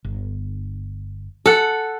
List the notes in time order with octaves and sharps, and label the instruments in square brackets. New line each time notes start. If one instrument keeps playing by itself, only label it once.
[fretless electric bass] G1
[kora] A4 F#5